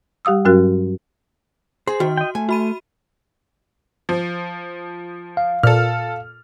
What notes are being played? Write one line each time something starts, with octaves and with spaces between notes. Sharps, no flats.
G3 G4 F5 D#6 E6
G2 F#3 C#4 F#4 A#4 F#6
G#4 C5 C6
D#3 F#4
D#5 G5
A3 G#5
F#4 B5 D#7
F3
F5
A#2 A4 F6